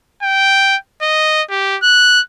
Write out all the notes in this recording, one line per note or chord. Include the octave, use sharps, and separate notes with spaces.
G5
D#5
G4
F#6